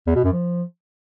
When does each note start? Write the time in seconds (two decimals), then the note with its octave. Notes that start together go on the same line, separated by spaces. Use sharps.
0.07 E2
0.16 B2
0.24 F#2
0.32 F3